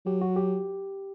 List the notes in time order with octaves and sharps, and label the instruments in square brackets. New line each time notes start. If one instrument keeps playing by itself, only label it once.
[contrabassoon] F#3 [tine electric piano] G4
[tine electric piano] F#4
G4